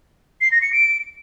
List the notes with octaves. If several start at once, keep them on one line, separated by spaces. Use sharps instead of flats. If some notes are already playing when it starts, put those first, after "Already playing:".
C7
A#6
C#7
D7